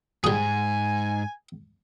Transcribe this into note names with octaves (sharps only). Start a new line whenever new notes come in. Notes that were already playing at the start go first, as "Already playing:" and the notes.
G#2 G3 G#4 G#5